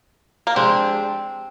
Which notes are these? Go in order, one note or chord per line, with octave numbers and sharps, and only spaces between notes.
A#3
F3 G#3 C4 D4 G4